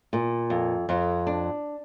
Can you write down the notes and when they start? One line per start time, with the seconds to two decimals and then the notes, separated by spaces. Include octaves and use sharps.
0.13 A#2
0.50 F2
0.89 F2
1.27 D4